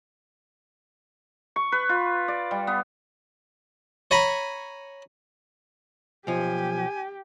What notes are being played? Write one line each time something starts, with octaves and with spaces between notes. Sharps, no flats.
C#6
B4
F4
D5
G3
B3
C#5 G#5 A#5 B5
B1 F3 G4 G#5